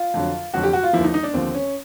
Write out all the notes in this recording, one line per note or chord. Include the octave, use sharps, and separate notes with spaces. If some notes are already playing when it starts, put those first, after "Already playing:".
Already playing: F4
F2 D3 F#3
F2 D3 F#3 F#4
G4
F#4
F4
D#2 D3 F3 E4
D#4
D#4
D4
D#2 D3 F3 C4
C#4